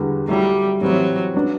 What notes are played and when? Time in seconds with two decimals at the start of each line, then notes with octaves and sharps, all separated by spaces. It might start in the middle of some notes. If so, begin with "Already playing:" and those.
Already playing: E2 D3 G3 B3 F#4
0.28 F#3 G3 A3 E4
0.81 A2 E3 F#3 G3 C4
1.34 F#3 B3 D4